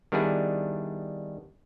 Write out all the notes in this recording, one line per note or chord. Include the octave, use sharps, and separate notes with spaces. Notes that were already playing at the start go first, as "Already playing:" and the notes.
D#3 G3 B3 D4 E4 G#4